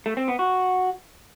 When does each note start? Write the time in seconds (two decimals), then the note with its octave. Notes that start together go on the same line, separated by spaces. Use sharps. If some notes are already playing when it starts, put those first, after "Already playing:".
0.06 A3
0.17 C4
0.28 B3
0.39 F#4